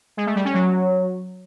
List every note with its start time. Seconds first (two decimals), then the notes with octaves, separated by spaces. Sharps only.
0.17 G#3
0.26 A3
0.36 G3
0.45 C#4
0.54 F#3